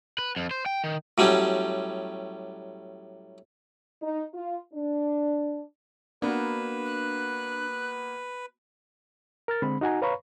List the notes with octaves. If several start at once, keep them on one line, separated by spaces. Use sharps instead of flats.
B4
F2
C5
G5
D#3
A2 F#3 G3 C#4
D#4
F4
D4
A#3 B3 D4 F#4 B4
F#6
A#4 F6 A6
D3 G#3 C4 B5
D#4 F#4 F#5 G#5 A#5
B4 C#5 F5 A#5 B5 C#6